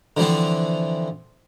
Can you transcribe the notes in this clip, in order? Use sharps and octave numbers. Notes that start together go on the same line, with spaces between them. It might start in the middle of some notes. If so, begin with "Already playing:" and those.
D3 E3 F3 C4